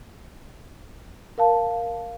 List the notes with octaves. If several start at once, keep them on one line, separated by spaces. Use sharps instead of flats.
A#4 F5 A5